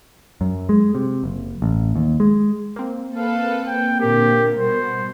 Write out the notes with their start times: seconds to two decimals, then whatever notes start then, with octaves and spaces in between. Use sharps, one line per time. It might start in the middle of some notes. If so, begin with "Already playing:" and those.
0.41 F#2
0.69 G#3
0.95 C3
1.24 F#1
1.62 A1
1.95 D#2
2.20 G#3
2.76 A#3 C4
3.16 A4 B4 F5
3.67 G5
4.00 A#2 D3 G4 A#4
4.57 B2 G3 C5